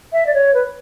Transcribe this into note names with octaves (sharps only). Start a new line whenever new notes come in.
E5
D5
C#5
B4